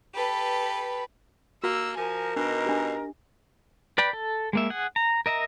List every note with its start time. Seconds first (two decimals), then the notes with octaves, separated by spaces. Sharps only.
0.14 G4 A4 B4
1.64 A#3 F#4 E6
1.97 F3 A#4 G#5
2.36 B2 D4 D#4
2.66 D4 G4
3.98 B4 D5 G5 B5
4.13 A4
4.53 G#3 A#3 E5
4.70 G#4 F#5
4.96 A#5
5.26 A#4 D#5 E5 A#5